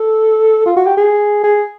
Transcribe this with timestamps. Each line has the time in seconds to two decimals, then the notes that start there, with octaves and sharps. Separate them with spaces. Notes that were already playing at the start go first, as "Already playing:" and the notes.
Already playing: A4
0.66 F4
0.76 F#4
0.86 G4
0.97 G#4
1.44 G#4